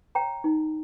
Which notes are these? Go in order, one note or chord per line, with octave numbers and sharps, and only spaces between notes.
C#5 G5 A#5
D#4